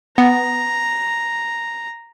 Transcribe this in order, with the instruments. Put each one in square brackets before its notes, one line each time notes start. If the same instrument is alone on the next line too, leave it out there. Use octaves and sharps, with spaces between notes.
[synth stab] B3 [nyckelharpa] A#5